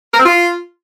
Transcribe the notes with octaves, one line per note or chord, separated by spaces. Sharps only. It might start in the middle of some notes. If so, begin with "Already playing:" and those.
A#4
C4
F4